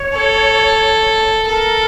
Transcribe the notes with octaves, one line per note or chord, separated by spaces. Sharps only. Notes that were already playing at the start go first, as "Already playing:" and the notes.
Already playing: C#5
A4
A4 A#4